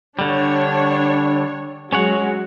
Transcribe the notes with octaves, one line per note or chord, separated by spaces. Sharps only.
D3 G3 D4 C#5
F#3 G#3 C#4 F#4 C#5 F#5